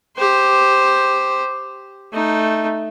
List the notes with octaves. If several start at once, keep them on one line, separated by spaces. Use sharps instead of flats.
G4 C5
A3 D#4